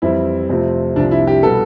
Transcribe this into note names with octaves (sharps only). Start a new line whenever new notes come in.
F2 E3 G3 C4 E4
F2 C3 F3 A3 C4
C2 C3 F3 D4
E4
G4
B2 G3 B3 A4